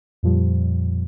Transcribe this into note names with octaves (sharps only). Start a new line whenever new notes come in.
F2 A#2 F3 G3